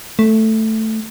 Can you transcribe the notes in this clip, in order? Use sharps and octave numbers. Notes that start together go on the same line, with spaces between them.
A3